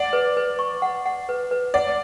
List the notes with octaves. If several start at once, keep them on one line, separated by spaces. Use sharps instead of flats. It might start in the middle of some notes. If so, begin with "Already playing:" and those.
Already playing: D5 F#5
B4
B4
C#6
F#5
F#5
B4
B4
D5 F#5